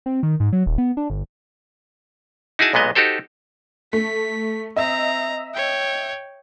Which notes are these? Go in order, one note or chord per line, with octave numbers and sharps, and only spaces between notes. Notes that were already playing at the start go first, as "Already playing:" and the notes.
C4
D#3
G#2
F#3
D#1
B3
D4
G1
D#4 E4 F#4 G#4 G#5 A5
B1 A#2 G#3 B3 D#5
D#4 F#4 G4 A4 C5
A3 B6
C4 D#5 E5 A#5
C#5 G5